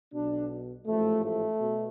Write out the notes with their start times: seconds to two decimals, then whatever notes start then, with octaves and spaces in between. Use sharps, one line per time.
0.13 B1 B2 D4
0.87 A1 G#2 F3 A3
1.24 A3
1.60 B2